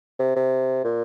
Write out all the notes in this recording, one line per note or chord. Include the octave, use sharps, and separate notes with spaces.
C3
C3
A#2